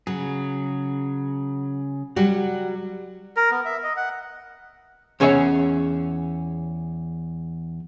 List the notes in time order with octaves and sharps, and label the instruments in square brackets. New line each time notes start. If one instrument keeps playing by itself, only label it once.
[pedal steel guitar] C#3 G#4 [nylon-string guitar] F#3
[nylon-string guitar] F#3 G3 F#4 [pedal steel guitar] F#5
[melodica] A#4
B3
E5
D#5
F#5
[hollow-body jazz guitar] E2 C#4 G#4 C#5 E5